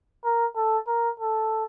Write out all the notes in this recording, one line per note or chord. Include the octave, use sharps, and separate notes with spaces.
A#4
A4
A#4
A4